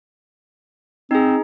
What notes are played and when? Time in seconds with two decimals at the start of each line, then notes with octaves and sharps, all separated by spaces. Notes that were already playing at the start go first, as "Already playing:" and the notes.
1.11 C4 D#4 G#4